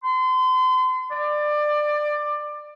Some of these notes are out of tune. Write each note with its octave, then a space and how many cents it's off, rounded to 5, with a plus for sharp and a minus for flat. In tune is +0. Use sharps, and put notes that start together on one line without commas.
C6 -35
D5 +20